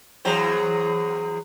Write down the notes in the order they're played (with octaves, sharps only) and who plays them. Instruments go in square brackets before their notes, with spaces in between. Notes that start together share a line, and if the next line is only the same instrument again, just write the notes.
[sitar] E2 F#3 C5 [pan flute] G#4